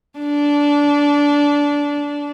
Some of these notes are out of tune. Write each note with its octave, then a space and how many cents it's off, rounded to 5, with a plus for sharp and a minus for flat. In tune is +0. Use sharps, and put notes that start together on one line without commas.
D4 -20